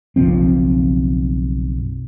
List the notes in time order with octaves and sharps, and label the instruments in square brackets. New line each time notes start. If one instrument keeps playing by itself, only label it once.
[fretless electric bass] F#1 B1 F3 C4